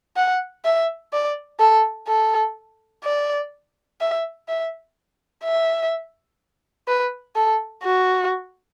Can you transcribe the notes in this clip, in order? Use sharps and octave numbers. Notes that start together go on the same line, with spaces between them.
F#5
E5
D5
A4
A4
D5
E5
E5
E5
B4
A4
F#4